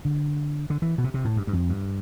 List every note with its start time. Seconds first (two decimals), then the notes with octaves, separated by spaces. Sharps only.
0.05 D3
0.70 D3
0.82 E3
0.98 B2
1.04 C3
1.14 C3
1.25 A2
1.37 G2
1.47 G2
1.53 F2
1.69 G2